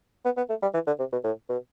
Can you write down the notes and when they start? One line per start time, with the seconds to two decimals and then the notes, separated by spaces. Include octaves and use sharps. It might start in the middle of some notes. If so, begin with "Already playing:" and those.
0.25 B3
0.37 B3
0.49 A3
0.62 G3
0.74 E3
0.87 D3
0.99 C3
1.12 B2
1.24 A2
1.49 B2